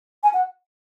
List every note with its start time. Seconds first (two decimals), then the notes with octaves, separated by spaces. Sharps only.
0.23 G#5
0.34 F#5